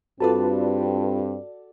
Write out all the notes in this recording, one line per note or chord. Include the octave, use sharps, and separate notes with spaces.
G2 C4 F4 F#4 A4 B4 D5 A5